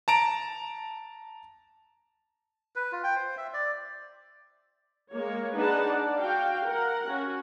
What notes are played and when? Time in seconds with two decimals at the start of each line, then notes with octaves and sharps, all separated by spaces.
0.08 A5 A#5 D7
2.76 B4
2.92 F4
3.04 G5
3.16 C5
3.37 E5
3.54 D5
5.13 G#3 A#3 C#5
5.56 D4 D#4 G#4 B4 F#5 A5
5.89 D5
6.22 F#4 F5 G5
6.67 A#4 F#5
7.08 C#4 F#4